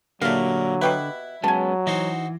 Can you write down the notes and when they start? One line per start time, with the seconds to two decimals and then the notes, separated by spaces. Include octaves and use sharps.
0.22 A#2 D3 F#3 G3 A3 A#4 F5
0.81 B2 E4 G4 B4
1.44 F#3 G#3 B3 C#4 G#5 A5
1.87 E3 D#4 F#4 C5